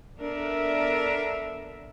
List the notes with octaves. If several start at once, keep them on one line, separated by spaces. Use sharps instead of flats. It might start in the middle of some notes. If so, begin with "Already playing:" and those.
B3 D4 A4 A#4 E5